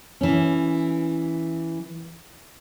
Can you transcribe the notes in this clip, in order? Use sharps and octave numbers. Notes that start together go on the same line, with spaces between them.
E3 C#4